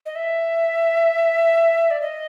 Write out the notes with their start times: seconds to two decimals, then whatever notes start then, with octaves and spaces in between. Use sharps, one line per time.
0.06 D#5
0.15 E5
1.91 D5
2.01 D#5